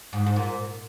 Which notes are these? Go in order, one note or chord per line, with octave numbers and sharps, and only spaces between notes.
G#2
G#2
A#2